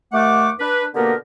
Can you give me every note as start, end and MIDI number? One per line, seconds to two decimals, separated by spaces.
0.12 0.50 39
0.12 0.50 57
0.12 0.50 78
0.12 0.50 86
0.60 0.85 62
0.60 0.85 71
0.94 1.13 47
0.94 1.13 50
0.94 1.13 58
0.94 1.13 59
0.94 1.13 67
0.94 1.13 70